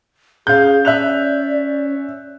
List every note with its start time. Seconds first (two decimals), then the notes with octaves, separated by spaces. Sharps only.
0.47 C#4 G#4 F5 G6
0.85 D5 E5 F#6 F7